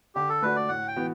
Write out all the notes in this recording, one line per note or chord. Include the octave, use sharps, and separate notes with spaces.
D3 G4
A4
A3 D4 F#4 B4
D5
A2 F#5
G5
E3 B3 F#4